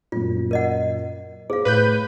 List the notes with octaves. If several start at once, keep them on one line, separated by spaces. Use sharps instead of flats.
F#2 A#2 F4
A#4 D#5 F#5
G#4 C5 F5
A2 B4 B5 G6